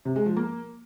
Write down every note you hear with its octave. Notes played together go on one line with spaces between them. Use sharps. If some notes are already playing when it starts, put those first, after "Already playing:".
C3
G#3
F3
A#3